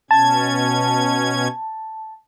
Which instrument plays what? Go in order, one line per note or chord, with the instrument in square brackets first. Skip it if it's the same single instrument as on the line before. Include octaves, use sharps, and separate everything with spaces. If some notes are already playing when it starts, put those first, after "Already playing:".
[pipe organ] B2 C#4 G#6 [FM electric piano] A5